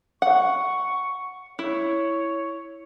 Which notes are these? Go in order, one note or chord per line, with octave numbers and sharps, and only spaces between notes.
F#5 C#6
E4 C#5